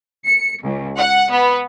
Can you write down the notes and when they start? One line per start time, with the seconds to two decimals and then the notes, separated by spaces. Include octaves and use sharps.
0.25 C#7
0.62 C#2
0.97 F#5
1.31 B3